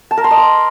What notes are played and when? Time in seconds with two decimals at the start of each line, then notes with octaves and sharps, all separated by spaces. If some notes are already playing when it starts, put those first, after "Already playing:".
0.11 A5
0.17 A#4
0.24 C6
0.31 D#5
0.37 D6